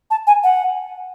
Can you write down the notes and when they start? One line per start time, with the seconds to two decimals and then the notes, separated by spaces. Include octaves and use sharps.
0.11 A5
0.27 G#5
0.44 F#5